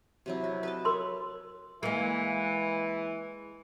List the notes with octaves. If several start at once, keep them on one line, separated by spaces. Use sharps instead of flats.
C3 F#3 E4
F#4
B4 D#5 A5
A#4 C#5 C6
E3 G#3 A#3